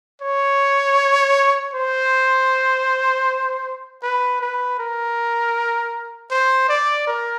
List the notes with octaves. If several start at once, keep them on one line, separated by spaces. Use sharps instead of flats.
C#5
C5
B4
B4
A#4
C5
D5
A#4